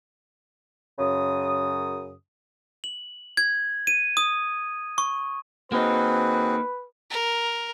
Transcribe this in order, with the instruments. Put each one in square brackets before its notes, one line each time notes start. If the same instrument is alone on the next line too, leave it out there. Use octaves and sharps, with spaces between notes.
[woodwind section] F#2 C#3 D#6
[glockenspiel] F#7
G#6
D#7
D#6
C#6
[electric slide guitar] A#3 D#4 [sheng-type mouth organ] C4 F#4 G#4 [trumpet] B4
[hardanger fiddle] A#4